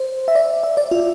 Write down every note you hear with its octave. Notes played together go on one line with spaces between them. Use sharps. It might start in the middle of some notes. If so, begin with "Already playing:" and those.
Already playing: C5
E5
D5
E5
D5
F4